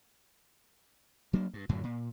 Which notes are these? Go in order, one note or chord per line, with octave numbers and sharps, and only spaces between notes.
F#3 A#3 D4
G2
F#2 A2 D3 F#3
A#2